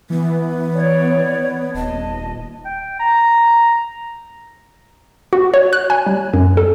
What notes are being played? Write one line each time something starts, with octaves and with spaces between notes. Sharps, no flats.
E3 B3
C#5 D5
D#1 D#5 A5
G5
A#5
F#4
C#5
F#6
G#5
G3
F#2
A4